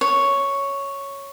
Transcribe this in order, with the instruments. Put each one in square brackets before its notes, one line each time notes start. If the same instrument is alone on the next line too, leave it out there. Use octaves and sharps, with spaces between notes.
[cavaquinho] C#5